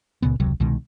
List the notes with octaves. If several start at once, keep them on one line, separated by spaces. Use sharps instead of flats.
C#2 A#2 C#3 B3
E1 C#2 C3 F#3
C2 B2 D#3 G#3